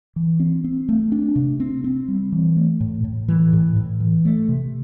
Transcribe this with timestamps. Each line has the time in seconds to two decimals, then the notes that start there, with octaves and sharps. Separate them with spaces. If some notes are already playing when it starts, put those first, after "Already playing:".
0.16 E3
0.40 C4
0.64 C4
0.89 A3
1.12 D4
1.36 C3
1.60 C4
1.84 C4
2.08 G3
2.32 E3
2.57 A3
2.81 A2
3.04 A2
3.28 E3
3.53 A2
3.76 A2
4.00 E3
4.25 A3
4.49 C3